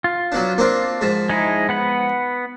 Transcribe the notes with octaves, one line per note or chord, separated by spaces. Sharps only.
F4
F#3 B3 D4
A#3 C4 D4
G#2 F3
G#3 D#4 E4
B3 F#5 B5